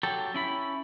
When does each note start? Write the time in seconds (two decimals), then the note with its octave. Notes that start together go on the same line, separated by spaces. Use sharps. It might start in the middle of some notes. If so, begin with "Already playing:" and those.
0.03 F#3 G4 A4
0.34 C#4 E4 B5